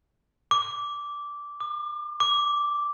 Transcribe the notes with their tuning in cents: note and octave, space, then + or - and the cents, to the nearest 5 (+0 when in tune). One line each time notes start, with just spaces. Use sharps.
D6 -10
D6 +35
D6 -5